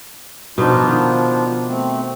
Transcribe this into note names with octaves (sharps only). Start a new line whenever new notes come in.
B2 F3 B3 D4 D#4 F4
D#3
A3 C4